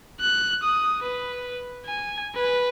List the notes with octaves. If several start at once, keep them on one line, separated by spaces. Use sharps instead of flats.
F#6
D#6
B4
G#5
B4